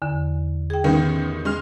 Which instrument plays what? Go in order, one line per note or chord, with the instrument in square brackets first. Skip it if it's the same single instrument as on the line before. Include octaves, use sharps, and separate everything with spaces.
[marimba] E2 D3
G#4 G5
[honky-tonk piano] A1 D#3 B3
G#3 C6 F6